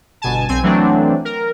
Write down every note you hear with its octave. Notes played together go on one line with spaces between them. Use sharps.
G1 B2 G#5 A5
B1 C4 G#5
E3 F#3 A3 C4 D4
A#4